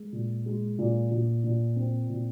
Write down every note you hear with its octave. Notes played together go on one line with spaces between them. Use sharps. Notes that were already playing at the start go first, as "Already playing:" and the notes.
Already playing: G#3
A#2
G#3
A#2
A#2
A#2
C4
A#2